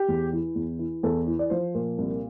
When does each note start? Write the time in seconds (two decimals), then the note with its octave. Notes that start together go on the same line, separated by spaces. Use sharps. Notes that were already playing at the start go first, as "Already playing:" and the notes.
Already playing: G4
0.08 E2
0.33 E3
0.55 E2
0.79 E3
1.03 E2 A4
1.27 E3
1.39 D5
1.50 F3 C5
1.75 A#2
1.98 C2